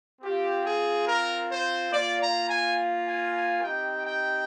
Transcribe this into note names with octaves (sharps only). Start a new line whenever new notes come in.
C4 F4 G4
G#4
A#4
C5
A#3 F4 D5
A#5
G#5
G#5
G#5
C4 D#4 G4 G5
G5